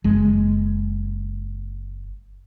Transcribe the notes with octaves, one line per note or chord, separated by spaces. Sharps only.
F#1 G#3